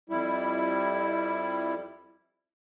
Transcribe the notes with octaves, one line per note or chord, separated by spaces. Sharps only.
F2 G3 E4